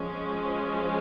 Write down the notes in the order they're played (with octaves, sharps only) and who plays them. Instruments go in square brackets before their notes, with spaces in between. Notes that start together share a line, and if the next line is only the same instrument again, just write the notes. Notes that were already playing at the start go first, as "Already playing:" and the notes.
Already playing: [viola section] F3 G#3 C#4